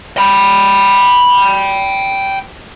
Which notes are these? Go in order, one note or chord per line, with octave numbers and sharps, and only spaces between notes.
G5 B5